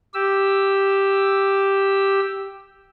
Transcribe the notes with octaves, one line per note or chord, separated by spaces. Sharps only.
G4 E6